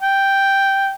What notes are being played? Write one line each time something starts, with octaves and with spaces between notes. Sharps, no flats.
G5